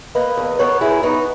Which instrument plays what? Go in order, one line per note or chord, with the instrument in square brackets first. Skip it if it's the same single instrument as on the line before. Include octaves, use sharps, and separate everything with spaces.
[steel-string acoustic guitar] A#3 B4 D#5
E2
B3 A#4 C#5
F#2 E4 G#4
B3 D#4 F#4